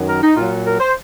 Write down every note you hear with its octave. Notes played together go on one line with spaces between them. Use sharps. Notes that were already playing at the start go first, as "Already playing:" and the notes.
Already playing: F#2 D#3 F#3
A#4
D#4
A#2 F#3 F4
A#4
C5